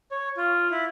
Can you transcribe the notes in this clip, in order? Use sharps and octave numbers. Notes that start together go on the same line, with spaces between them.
C#5
F4
E4